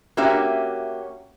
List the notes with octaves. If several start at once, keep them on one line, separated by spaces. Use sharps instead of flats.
A#3 C#4 F#4 G4 E5